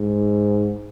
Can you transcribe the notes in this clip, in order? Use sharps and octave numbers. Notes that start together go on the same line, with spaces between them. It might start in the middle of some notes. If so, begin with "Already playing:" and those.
Already playing: G#2